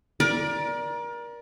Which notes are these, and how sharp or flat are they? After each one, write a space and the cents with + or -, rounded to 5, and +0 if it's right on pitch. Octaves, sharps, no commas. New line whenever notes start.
A#4 +30 D5 +0